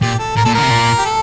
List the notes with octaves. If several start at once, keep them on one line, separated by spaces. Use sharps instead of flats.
A#2 G4
A4
A2 A#4
A#2 A4
A2 D3 A#4
C3
A#2
G4
A4